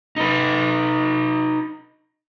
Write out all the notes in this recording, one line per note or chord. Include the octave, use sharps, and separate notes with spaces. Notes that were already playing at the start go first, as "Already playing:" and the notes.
D#4 B4